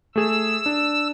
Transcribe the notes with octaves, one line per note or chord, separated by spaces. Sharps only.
A3 G#4 E6
D4